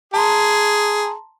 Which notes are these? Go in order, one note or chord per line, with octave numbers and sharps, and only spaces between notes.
G#4 A5 A#5 C6